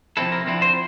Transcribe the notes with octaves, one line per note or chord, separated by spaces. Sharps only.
C3 F3 C4 E4 A4
A#4
D3 F3 C4 E4
C5